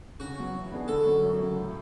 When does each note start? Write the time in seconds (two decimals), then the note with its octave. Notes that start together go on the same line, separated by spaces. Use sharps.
0.20 C#3 F#4
0.38 F#3 B3
0.54 E3
0.71 B3 D4 G#4
0.88 D3 A4
1.05 F#3 C#4
1.23 F#2
1.39 C#3 F#3
1.56 A2